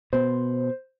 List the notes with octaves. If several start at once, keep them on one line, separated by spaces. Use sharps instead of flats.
B2 B3 C5